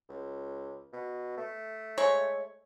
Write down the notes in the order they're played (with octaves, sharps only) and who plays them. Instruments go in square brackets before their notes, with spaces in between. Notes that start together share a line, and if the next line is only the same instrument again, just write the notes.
[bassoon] C#2
B2
A3
[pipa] G#3 C#5